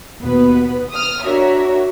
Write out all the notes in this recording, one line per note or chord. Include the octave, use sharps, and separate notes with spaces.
D#2 B2 B3 B4
D#6 F6
D4 F#4 A#4 C#5 E5